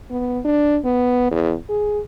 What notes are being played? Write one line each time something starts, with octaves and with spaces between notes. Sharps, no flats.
B3
D4
B3
E2
G#4